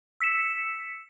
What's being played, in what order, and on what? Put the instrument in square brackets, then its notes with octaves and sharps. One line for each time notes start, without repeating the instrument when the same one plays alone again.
[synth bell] E6 B6 C#7 E7